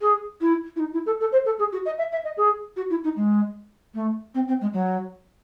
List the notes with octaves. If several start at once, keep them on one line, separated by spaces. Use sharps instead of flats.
G#4
E4
E4
D#4
E4
A4
A4
C5
A4
G#4
F#4
D#5
E5
E5
D#5
G#4
F#4
E4
D#4
G#3
A3
C4
C4
G#3
F#3